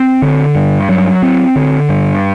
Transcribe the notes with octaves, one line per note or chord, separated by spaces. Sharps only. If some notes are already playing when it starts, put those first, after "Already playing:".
Already playing: C4
D3
G2
F#3
C4
D3
G2